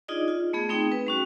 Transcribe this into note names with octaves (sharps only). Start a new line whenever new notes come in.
D4 D#4 F4 G#4 D5 D#5
F4
A3 B3 G#4
A3 C4 D#4 G#4 G5
B4
G3 C#4 F#4